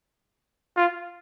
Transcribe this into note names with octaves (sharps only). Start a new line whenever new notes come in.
F4